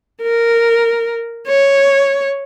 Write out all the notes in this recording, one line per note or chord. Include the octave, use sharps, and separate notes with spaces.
A#4
C#5